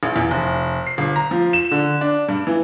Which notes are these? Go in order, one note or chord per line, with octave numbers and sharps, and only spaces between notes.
A1
E2
F1
C7
G1
A#5
F3
E7
D3
D4
G2
E3